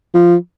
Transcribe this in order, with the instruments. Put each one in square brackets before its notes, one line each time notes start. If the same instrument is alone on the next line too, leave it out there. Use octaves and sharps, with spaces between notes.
[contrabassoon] F3